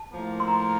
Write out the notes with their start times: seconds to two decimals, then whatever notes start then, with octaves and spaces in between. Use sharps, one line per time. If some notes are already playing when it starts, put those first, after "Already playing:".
Already playing: A5
0.13 A2 F3 A#3
0.40 C6
0.48 A#5